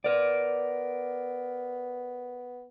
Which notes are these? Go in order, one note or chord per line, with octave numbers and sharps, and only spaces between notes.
B3 A#4 D5